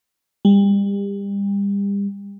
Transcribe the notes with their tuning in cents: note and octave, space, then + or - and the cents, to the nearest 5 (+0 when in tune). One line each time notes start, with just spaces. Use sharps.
G3 +35